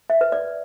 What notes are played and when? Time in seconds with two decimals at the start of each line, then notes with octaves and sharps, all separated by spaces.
0.10 E5
0.21 B4
0.32 D5